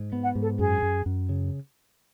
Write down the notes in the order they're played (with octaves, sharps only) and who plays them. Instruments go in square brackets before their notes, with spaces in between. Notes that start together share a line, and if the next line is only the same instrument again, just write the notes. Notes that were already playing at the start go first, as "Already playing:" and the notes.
Already playing: [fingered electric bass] G#2
B3
[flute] F#5
[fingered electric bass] G#2
[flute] A4
[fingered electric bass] F#2 [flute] G#4
[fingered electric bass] F#2
F#2
C#3